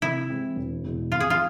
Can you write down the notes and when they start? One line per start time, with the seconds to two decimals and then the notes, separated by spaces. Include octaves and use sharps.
0.01 C3 E4
0.30 E3 G#3 C4
0.56 E1
0.84 E2 B2 G#3
1.11 F2 F4
1.20 G#4
1.30 F4